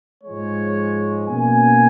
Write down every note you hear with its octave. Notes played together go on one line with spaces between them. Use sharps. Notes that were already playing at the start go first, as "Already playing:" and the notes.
G#2 F3 G#3 C#5
B2 A#3 C#4 G#5